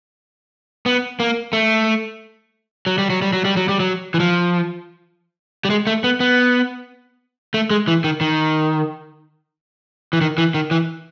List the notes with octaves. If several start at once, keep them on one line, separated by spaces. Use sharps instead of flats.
B3
A#3
A3
F#3
G3
F#3
G3
F#3
G3
F#3
G3
F#3
E3
F3
G3
G#3
A3
B3
B3
A3
G#3
E3
D#3
D#3
E3
D#3
E3
D#3
E3